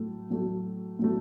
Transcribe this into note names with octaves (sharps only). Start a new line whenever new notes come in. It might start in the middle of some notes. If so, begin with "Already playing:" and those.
Already playing: A2 F#3 A3
A2 F#3 A3
A2 F#3 A3